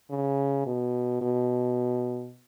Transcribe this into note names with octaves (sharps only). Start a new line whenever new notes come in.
C#3
B2
B2